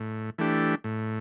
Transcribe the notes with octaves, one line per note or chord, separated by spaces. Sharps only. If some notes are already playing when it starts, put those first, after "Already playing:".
Already playing: A2
E3 A3 D4 G4
A2